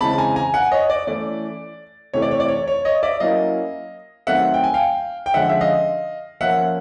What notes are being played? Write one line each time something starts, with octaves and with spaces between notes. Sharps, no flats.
C#3 E3 G#3 C4 A5 B5
A5
G#5 A#5
G#5 A#5
F#5 G#5
C#5 D#5
D5
E3 A3 C#4 E4 D5
C3 E3 A3 C#5
D5
C#5
D5
C#5
C#5
C#5 D#5
D5 E5
F#3 A#3 C#4 E4 D#5 F5
D#3 F#3 A3 C4 E5 F#5
G5
G#5
F5 G5
G5
D3 F3 G#3 C#4 E5 F#5
E5
D#5 F5
F3 A#3 C#4 E5 F#5